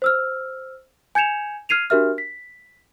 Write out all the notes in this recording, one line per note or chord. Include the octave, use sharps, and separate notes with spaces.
C5 E6 F6
G#5 G6 G#6 C#7 E7 F7
F6 G#6 C7 D#7 F7
D4 F#4 G4 A#4 E5 F6
B6